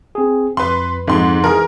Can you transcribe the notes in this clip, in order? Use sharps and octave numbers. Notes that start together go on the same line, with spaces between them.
C4 G#4
F2 B4 C6
F2 G#2 C6
E3 G#4 A#4